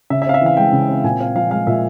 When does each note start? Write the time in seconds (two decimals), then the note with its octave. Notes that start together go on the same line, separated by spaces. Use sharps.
0.10 C#3 E5
0.22 E5
0.27 C4 F5
0.34 E5
0.41 E3 F5
0.57 G#3 G5
0.73 C#3
0.88 C4
1.04 A#2 G#5
1.20 C4 F5
1.35 F3 F5
1.51 G#3 F5
1.67 A#2 E5